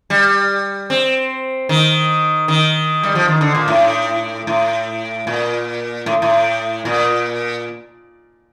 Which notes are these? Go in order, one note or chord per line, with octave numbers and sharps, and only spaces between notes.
G3
C4
D#3
D#3
G3
F3
D#3
D3
A#2
A2
A2
A#2
A2
A2
A#2